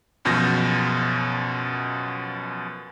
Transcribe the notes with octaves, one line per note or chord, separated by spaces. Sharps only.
C#2 F#2 B2 F3 G6 A#6